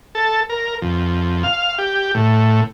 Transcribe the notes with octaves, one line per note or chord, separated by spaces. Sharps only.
A4
A#4
F2
F5
G4
A2